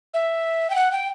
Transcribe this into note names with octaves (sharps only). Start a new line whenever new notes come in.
E5
G5
F#5
G5